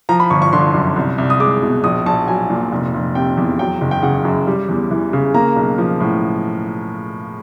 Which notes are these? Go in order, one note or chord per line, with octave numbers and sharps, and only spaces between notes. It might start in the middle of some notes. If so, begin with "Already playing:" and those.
F3 A#5
B5
G1 C#6
C#6
D3 C6
F#2
C2
C2
D#6
G#3 D6
B2
A#1 D#6
A#1 A5
F#3 G#5
A#2
F1
F1
C3 G5
E2
F#3 G5
F#1
G5
C#3 F#5
F#2
G3
E2
E3
C#3
A#3 A#5
B1
F3
A2